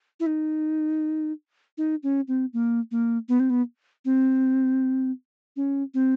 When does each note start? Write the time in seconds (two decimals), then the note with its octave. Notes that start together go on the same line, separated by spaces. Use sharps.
0.20 E4
0.26 D#4
1.78 D#4
2.03 C#4
2.28 C4
2.53 A#3
2.91 A#3
3.29 B3
3.40 C4
3.50 B3
4.05 C4
5.56 C#4
5.94 C4